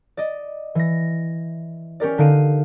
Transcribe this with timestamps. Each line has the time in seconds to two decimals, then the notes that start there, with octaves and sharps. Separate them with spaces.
0.17 D5 D#5
0.75 E3 A#6
2.00 C#4 G4 A#4 D5
2.18 D3 D#4 F5 D7 D#7